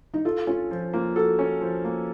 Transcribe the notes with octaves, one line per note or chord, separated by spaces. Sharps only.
D#4
F4 A4
C#4 F4
F3
A#3 F4
F#4 A4
C#4
F3
A#3